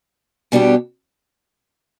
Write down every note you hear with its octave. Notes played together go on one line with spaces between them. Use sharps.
B2 G3 B3 D4 G4